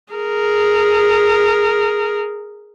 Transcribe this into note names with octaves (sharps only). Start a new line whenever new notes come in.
G#4 A#4